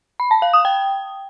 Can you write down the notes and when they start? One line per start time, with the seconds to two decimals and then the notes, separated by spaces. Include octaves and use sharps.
0.20 B5
0.31 A5
0.42 F5
0.54 D#6
0.65 G5